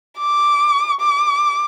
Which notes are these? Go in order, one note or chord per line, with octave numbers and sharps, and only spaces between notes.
D6
D6